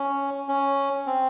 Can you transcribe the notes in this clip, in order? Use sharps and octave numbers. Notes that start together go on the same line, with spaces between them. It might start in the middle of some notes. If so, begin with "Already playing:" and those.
Already playing: C#4
C#4
C4